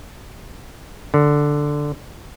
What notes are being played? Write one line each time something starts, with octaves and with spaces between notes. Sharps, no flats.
D3